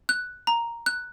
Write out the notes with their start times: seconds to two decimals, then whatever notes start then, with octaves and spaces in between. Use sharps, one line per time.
0.09 F#6
0.47 A#5
0.86 F#6